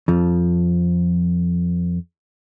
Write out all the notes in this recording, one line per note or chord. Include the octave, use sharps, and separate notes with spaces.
F2 F3